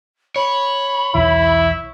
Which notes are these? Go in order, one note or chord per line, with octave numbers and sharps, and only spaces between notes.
C#5 B5
B1 E2 E3 E4